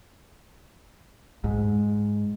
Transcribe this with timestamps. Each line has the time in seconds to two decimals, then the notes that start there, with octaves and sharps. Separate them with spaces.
1.44 G#2